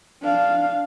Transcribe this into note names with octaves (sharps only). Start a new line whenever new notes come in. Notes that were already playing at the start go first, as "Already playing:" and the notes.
D4 F5